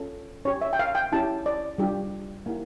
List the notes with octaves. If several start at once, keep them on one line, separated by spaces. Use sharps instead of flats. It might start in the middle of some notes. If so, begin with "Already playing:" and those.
Already playing: C#4 F4 A4
C#4 G4 C#5
E5
G5
F5
G5
C#4 E4 G4 A5
D5
G3 D4 F4 G4
A#3 E4 G4